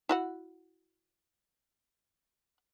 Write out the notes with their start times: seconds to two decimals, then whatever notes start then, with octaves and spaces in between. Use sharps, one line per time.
0.09 E4 F#4 F#5